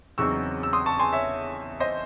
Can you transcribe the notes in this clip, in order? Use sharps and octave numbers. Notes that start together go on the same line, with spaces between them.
E2 C#3 F#3 C4 D#4 C#6 E6
E6
C6 D#6
A5 C#6
G#5 C6
C#5 E5
C5 D#5